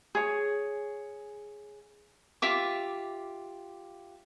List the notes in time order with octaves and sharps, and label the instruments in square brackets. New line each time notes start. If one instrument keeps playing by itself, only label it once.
[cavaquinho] G#4 C#5
F4 G4 E5 D6